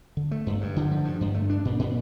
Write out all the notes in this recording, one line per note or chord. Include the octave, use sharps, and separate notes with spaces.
D3
A3
G2
G2
D3
F3
G2
G2
A3
D4
A#2
A#2